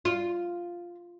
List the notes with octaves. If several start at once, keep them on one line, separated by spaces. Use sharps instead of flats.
F4